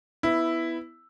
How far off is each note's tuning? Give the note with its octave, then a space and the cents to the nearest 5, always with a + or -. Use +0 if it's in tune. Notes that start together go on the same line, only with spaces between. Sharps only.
B3 +15 E4 +0